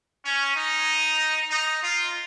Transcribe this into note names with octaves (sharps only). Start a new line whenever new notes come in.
C#4
D#4
D#4
F4